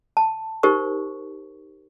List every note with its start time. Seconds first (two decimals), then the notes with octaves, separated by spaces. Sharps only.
0.17 A5
0.63 D#4 G4 A#4 C5 C#6